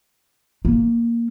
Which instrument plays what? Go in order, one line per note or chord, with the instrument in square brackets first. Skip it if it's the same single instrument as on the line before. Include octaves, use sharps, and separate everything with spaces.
[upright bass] A#3